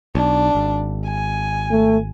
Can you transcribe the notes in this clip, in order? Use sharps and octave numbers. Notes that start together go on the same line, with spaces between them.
B1 D4
G#1
G#5
A3